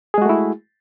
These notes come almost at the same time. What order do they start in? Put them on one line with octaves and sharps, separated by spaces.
G#4 G#3 F#4 A3 E4